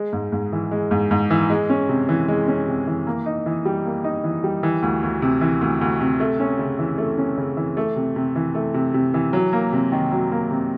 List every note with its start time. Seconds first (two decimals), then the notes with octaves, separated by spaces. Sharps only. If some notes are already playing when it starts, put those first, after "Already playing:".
Already playing: G#3
0.13 G#2
0.32 G#2
0.52 E3
0.71 G#3
0.91 G#2
1.11 G#2
1.31 E3
1.50 G#3
1.70 C#4
1.89 C3
2.09 E3
2.28 G#3
2.48 C#4
2.68 C3
2.87 E3
3.07 A#3
3.26 D#4
3.46 E3
3.65 G3
3.85 A#3
4.04 D#4
4.24 E3
4.44 G3
4.63 E3
4.82 D2
5.03 D2
5.22 C3
5.41 E3
5.61 D2
5.81 D2
6.01 C3
6.20 A3
6.40 C#4
6.59 C#3
6.79 E3
6.98 A3
7.18 C#4
7.38 C#3
7.57 E3
7.77 A3
7.96 C3
8.16 C3
8.36 E3
8.55 A3
8.74 C3
8.94 C3
9.14 E3
9.33 F#3
9.53 A#3
9.73 C3
9.92 D#3
10.12 F#3
10.31 A#3
10.51 C3